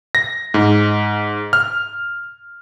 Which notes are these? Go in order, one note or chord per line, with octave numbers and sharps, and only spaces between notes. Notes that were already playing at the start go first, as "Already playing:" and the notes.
A#6
G#2
F6